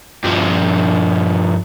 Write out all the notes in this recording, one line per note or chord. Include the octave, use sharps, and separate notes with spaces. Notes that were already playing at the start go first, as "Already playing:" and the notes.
G2 F3